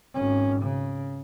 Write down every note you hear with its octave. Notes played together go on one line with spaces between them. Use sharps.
G#1 C#4
C#3